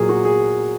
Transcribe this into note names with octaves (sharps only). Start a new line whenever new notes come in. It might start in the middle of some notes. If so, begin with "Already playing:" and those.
Already playing: A#2 F#3 G#4 A#4
F#4
G#4